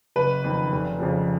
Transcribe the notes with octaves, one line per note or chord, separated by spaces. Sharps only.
F#1 B4
F2 D#3
F1
F2 C#3 F3